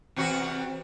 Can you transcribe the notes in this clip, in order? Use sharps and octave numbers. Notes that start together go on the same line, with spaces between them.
E2 C3 F#4